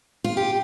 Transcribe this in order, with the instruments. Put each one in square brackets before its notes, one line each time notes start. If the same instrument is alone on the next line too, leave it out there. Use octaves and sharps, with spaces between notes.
[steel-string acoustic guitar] F4
G4